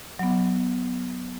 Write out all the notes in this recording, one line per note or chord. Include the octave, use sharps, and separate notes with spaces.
F#3 B3